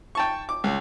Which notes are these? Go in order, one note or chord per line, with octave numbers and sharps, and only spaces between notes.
G5 A5 C#6
D6
C#2